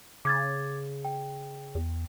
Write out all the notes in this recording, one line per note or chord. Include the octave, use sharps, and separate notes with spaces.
C#3 D6 G#6 A6
G5
E2